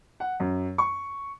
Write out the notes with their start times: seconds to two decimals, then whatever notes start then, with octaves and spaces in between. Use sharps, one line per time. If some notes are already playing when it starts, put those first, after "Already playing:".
0.20 F#5
0.40 F#2
0.78 C#6